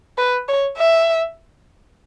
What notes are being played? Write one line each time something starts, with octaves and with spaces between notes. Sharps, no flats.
B4
C#5
E5